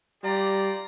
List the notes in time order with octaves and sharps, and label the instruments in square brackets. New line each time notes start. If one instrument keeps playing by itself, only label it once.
[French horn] G3 [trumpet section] F4 G4 D5 [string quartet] A#5